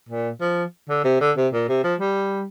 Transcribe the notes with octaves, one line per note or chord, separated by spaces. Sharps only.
A#2
F3
D3
C3
D3
C3
A#2
C3
F3
G3